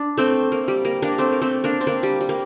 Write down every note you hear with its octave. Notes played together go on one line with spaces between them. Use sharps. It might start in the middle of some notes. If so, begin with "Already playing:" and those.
Already playing: D4
A3 C4
A#3
G3
A#3
A#3 D4
A3 C4
A#3
A3 C4
A#3 D4
C4
A#3 D4
G3
G3
A#3